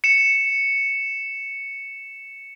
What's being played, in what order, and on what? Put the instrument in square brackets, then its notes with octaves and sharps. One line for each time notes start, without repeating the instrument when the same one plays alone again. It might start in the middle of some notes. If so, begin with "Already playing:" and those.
[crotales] C#7 E7